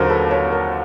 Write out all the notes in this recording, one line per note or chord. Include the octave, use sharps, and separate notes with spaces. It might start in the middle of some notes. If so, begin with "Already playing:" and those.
Already playing: D#2 D3 F#3 A#4 C5
A4 B4
B4 C#5
A#4